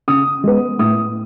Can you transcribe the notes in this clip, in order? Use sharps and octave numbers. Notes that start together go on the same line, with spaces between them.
C#3 D#6
G#3 B3
A2 D#6